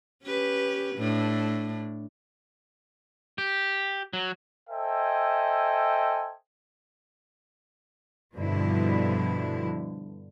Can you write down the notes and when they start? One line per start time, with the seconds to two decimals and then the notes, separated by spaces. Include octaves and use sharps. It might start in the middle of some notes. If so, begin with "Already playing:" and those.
0.24 C#4 G4 B4
0.96 A2 D4
3.38 G4
4.13 F#3
4.70 A4 C5 D#5 E5 G5 G#5
8.35 G2 B2 D3 F3 E4